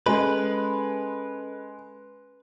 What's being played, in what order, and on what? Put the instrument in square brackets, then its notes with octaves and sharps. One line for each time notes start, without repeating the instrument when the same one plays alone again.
[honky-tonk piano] G#3 [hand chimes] C#4 A4 [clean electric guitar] B4